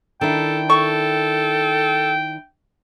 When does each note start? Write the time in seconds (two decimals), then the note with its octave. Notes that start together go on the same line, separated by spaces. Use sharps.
0.21 D#3 D4 E4 A4 G5
0.70 A4 C#6